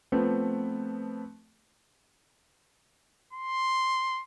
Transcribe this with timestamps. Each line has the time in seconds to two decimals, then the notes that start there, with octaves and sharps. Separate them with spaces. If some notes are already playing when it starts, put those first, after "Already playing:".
0.12 F3 A3 B3 C4
3.33 C6